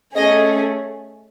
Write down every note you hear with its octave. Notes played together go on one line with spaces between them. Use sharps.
A3 C#4 G#4 D#5